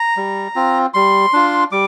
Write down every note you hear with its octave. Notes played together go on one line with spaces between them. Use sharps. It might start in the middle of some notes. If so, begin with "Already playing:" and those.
Already playing: A#5
G3
C4 F4
G3 C6
D4 F4
G3 D6